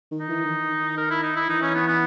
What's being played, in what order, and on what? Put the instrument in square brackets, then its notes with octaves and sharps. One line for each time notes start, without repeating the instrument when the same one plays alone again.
[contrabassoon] D#3
[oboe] D#4
[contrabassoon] E3
D#3
[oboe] A#4
E4
D#4
E4
[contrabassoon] E3 [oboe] D#4
[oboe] C#4
B3
B3